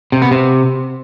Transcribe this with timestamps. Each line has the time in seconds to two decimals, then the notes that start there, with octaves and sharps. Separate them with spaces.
0.12 C3
0.22 B3
0.31 C3